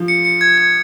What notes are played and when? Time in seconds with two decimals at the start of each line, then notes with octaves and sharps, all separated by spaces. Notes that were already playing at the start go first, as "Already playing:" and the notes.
Already playing: F3
0.08 C#7
0.25 C#7
0.41 G#6
0.58 G#6